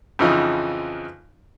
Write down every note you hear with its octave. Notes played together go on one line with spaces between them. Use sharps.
F2 C#3 E3 F3 D#4